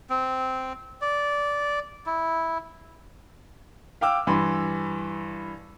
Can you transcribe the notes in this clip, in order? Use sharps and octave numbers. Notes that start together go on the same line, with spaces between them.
C4
D5
E4
F5 G5 D6 E6
G2 E3 B5 C6